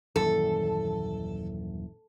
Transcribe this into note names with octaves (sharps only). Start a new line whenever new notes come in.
D#1 F#2 E3 A4